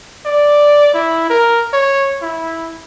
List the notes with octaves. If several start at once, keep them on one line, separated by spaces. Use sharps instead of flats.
D5
E4
A#4
C#5
E4